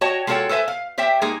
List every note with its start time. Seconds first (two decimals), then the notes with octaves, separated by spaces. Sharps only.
0.01 F#4 C#5 D#5 G5 A5
0.27 G#3 F4 F#4 A4 C#5 G5
0.49 A4 B4 C5 E5 G#5
0.68 F5
0.98 G4 C5 E5 G5
1.22 G#3 A#3 D#4 G#4